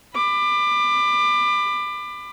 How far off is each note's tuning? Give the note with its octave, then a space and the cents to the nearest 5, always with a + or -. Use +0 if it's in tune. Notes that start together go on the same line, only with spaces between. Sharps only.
B5 +20 D6 +25